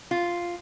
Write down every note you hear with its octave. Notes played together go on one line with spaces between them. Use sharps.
F4